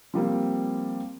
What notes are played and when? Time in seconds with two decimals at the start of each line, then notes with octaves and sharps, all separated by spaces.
0.14 F3 G3 A#3 C4